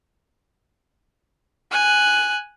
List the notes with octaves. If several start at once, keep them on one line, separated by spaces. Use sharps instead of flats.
G#5 F#6